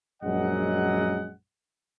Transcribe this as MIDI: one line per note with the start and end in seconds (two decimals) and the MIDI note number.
0.23 1.32 34
0.23 1.32 42
0.23 1.32 54
0.23 1.32 56
0.23 1.32 75
0.23 1.32 78